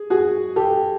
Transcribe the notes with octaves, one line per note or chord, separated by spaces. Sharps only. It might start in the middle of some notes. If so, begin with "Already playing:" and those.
Already playing: G#4
F#4 G#4
G4 A4